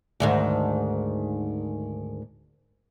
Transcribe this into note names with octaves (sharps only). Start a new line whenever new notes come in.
D2 G#2 D#3